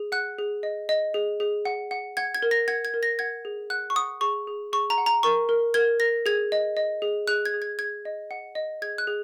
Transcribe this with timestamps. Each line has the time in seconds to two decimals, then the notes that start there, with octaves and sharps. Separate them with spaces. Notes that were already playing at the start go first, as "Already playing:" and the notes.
Already playing: G#4
0.12 F#5 F#6
0.39 G#4
0.63 D#5
0.89 D#5
1.14 G#4
1.40 G#4
1.65 F#5
1.91 F#5
2.17 F#5 G#6
2.35 G#6
2.42 A#4
2.51 A#6
2.68 F#5 G#6
2.85 G#6
2.94 A#4
3.03 A#6
3.19 F#5 G#6
3.45 G#4
3.70 F#5 F#6
3.90 C#6
3.96 F#5 D#6
4.21 G#4 C#6
4.47 G#4
4.73 G#4 C#6
4.90 A#5
4.98 F#5
5.06 A#5
5.23 A#4 C#6
5.49 A#4
5.74 A#4 G#6
6.00 A#4 A#6
6.26 G#4 G#6
6.52 D#5
6.77 D#5
7.02 G#4
7.28 G#4 F#6
7.46 G#6
7.54 G#4
7.62 G#6
7.79 G#4 G#6
8.05 D#5
8.31 F#5
8.55 D#5
8.82 G#4 G#6
8.98 F#6
9.07 G#4